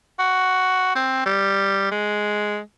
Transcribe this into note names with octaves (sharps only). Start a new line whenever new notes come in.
F#4
C4
G3
G#3